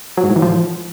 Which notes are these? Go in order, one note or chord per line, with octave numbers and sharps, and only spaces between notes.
F#3
G#2
A2
E3
F3